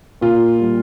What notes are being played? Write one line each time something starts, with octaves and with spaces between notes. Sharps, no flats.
A#2 F4
G3